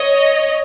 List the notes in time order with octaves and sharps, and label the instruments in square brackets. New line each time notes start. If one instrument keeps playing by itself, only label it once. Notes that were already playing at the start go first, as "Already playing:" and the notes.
Already playing: [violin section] C#5 D#5